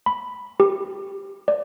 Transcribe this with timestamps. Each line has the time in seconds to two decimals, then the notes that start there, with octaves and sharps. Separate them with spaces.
0.06 B5
0.60 G4
1.48 D5